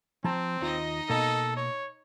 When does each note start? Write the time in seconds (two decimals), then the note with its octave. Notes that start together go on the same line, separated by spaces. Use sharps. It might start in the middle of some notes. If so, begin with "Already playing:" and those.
0.24 F3 C4 A5 A#5
0.61 D#2 D#4 F4 D#5
1.10 B2 A#3 A4
1.57 C#5